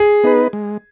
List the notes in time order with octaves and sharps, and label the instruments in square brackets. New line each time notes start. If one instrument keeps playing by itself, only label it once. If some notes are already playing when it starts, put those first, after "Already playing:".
Already playing: [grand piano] G#4
[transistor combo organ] B3 D#4 B4
G#3